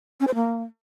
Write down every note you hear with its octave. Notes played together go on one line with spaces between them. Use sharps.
C#4
C5
A#3